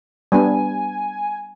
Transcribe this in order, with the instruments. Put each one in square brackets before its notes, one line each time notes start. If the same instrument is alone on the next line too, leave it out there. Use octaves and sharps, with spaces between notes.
[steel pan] G3 B3 D4 [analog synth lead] G#5